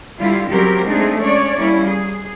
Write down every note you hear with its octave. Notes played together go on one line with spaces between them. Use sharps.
D3 G3 E4 F4
C#3 F#3 G3 C4 G4 A#4
G#3 A3 C4 D4 D#4 G#4
C#4 D4 C#5 D5
G3 A#3 C#4 E4
G#4